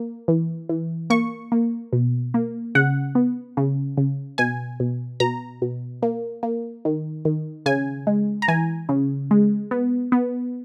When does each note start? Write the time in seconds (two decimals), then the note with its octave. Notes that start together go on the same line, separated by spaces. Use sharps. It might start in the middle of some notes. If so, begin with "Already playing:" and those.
Already playing: A#3
0.28 E3
0.69 E3
1.10 A#3 C#6
1.52 A#3
1.93 B2
2.34 A#3
2.75 C#3 F#5
3.15 B3
3.57 C#3
3.97 C#3
4.38 B2 G#5
4.80 B2
5.20 B2 A#5
5.62 B2
6.03 A#3
6.43 A#3
6.85 D#3
7.25 D#3
7.66 C#3 G#5
8.07 G#3
8.42 A#5
8.48 E3 G#5
8.89 C#3
9.31 G#3
9.71 B3
10.12 B3